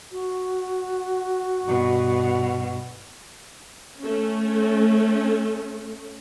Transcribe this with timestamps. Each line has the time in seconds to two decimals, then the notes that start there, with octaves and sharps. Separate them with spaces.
0.12 F#4
1.64 G2 B2
4.01 A3 C#4